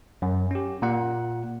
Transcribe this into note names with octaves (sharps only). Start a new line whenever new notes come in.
F#2
C#4 G4
A#2 A#3 F#5